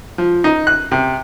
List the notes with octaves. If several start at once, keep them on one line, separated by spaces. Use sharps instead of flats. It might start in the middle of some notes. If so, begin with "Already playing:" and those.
F3
D#4
F#6
C3